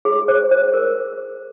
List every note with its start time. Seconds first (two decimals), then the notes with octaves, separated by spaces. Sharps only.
0.05 G#4
0.28 C5
0.51 C5
0.74 A#4